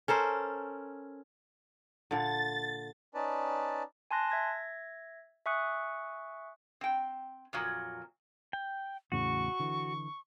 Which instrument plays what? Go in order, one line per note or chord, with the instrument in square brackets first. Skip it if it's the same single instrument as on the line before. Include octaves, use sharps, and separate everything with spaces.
[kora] C#4 A4 A#4 C5
[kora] A#2 D3 [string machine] A6
[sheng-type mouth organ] C#4 D#4 B4 D5 A5
[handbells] G#5 A5 C6 F#6 A#6
E5 G#6 A#6
E5 G#5 C#6 D#6 F#6 C#7
[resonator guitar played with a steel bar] C4 G5
F2 A#2 F#3
[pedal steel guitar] G5
[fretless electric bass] E2 A2 C#3 [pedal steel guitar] F#4 [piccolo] C#6
[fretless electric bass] D3 E3